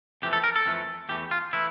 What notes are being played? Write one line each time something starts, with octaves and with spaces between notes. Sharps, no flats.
F2 E3 A3 G4
A4
A#4
A4
F2 E3 A3
E2 E3 A3 G4
F4
E3 A3 E4